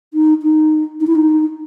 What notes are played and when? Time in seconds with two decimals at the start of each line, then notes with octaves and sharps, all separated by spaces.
0.14 D#4
0.43 D#4
1.00 D#4
1.07 E4
1.15 D#4